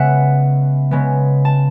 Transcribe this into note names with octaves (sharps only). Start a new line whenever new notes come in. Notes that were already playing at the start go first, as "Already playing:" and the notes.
Already playing: C#3 G#3 B3 E5 F#5
C#3 G#3 B3
A5